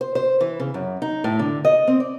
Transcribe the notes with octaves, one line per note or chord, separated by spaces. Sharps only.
C5
C5
E3
C#3
F#2
D#4
A2
D3
D#5
C4
D5